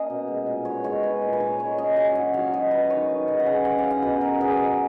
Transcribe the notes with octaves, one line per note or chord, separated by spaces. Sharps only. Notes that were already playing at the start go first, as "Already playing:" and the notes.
Already playing: A#3 C#4 D#5
B2
G#3
A#2
B3 C#5
G#3 C#5
G#3 B4
A#2
B4
A#2 C#5
G#3 C#5
C#4 D#5
F#3 G#5
F#3 F#5
F#3 F5
F#3 D#5
C#4 B4
D#3 C#5
D#3
C#3 D#5
F#5
C#3 G#5
C#3 F#5
F5
C#3
F#5
B2 B4
F#3 A#4
B2 G#4
B2